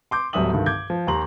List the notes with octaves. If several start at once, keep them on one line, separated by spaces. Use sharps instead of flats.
C6 D6 G6
D1 F#3 G3 E5 D#6 F#7
C2 G2 D3 D#3
D6 G6 G#6
F3
D#2 G4 A#5 C6 F#7